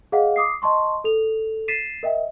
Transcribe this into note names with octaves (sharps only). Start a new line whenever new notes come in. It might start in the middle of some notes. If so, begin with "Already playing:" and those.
G#4 D#5 F5 F#5
D6 D#6 C7
D#5 A5 C6 C#6
A4 F7
A6 B6 C7 D#7 E7
A#4 D#5 E5 G5